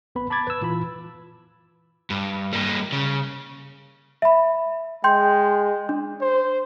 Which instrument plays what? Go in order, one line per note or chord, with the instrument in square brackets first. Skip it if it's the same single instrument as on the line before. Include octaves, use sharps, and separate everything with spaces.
[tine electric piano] A1 B3 B4 B5
A5 B5 D6 G#6 A6
B4 E6
A#2 E3 F4 B5
[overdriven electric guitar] G2
G3 A#3
C#3
[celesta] E5 B5
[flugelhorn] G#3 [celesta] G5 C6 G6
[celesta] D4
[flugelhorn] C5